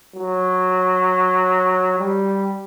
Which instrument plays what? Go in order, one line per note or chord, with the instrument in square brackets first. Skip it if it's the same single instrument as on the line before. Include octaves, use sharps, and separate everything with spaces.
[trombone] F#3
G3